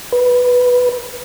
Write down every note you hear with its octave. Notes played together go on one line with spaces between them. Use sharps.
B4